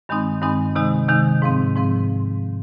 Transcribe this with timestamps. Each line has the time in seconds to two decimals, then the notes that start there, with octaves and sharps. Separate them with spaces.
0.09 G2 D#3 G#3 C4 D#4
0.42 G2 D#3 G#3 C4 D#4
0.76 C3 D#3 G#3 D#4
1.08 C3 D#3 G#3 D#4
1.42 G#2 F3 C4
1.76 G#2 F3 C4